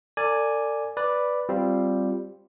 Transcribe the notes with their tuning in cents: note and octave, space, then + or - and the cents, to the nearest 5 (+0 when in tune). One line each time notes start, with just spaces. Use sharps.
A4 +45 D5 +0 G#5 +0
B4 +0 D5 +0
G3 +0 C4 +0 F4 +0